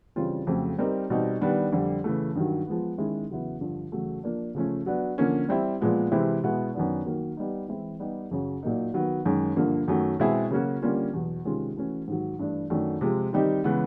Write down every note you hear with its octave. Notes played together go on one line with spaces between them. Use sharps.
C#3 E3 G3 C4 F4
F2 C#3 F#3 A3 C4
G3 C4 D#4 G4 A#4
B2 G3 C4 D#4
D#3 G3 B3 D4
F2 D3 G3
C#3 E3 A3
G2 D#3 F#3
F3 G#3 B3
D#3 G#3 C#4 E4
E2 C#3 F#3 B3 E4
G2 D3 F3
E2 C#3 F#3 A3
F3 A#3 D4
C#3 F3 A3 C#4
F#3 B3 D4
D3 F3 A#3 C#4
G3 C4 E4
A#2 F3 G#3 B3
C3 E3 G#3 C4 E4
B2 G#3 B3 E4
F#2 D#3 F#3 B3 D4
D#3 F#3 A#3
G3 B3 D#4
E3 G#3 C4 E4
G3 B3 D#4 G4
F#2 C#3 F#3
A#2 F#3 A#3 D#4
D#3 F#3 B3
F#2 D#3 G#3 C#4
G2 D3 F3 A#3
F#2 D#3 F#3 A3
B2 G#3 C4 E4 G#4
C#3 F#3 A#3 C#4 F#4
D3 G3 A#3 C#4 F4
E2 B2 F#3
C3 D#3 G#3 C#4 F4
E3 A3 C#4 F#4
G#2 D#3 F#3
G2 E3 A3 D4
F#2 D#3 F#3 A3 D4
C3 F3 G#3 C4 F4
D#3 G3 C4 D#4 G4
C#3 E3 G#3 B3